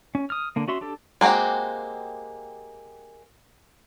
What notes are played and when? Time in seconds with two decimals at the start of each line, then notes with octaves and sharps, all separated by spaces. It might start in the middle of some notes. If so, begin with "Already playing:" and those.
0.15 C#4
0.30 D#6 F6
0.56 D3 A#3
0.68 C#4 F#4 E5 C6
0.81 D4 G4 A4
1.21 G#3 A#3 C4 F#4 G4